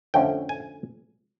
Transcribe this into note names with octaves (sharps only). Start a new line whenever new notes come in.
F2 D3 F3 A3 C#4 G5
G#5